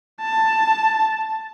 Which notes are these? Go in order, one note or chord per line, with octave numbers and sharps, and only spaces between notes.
A5